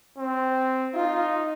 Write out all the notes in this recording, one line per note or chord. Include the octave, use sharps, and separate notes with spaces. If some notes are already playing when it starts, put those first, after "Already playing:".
C4
D#4 F4